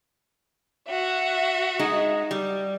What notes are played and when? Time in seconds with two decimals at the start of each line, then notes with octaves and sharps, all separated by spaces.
0.89 F#4 E5
1.79 G#3 D#4
2.31 G3